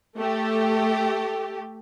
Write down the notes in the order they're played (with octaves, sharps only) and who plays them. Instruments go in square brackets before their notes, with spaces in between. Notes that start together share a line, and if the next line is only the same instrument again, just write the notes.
[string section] A3 G4